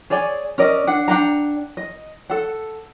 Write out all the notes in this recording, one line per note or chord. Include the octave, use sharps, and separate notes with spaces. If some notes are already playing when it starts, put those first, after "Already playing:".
G#4 C#5 D5 G#5
C#4 A#4 D5 D#5
D4 F#5
D4 F#5 G5 A#5
D#5
A4 F#5